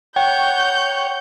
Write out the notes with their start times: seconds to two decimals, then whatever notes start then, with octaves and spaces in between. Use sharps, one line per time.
0.16 C#5 F#5 G5 G6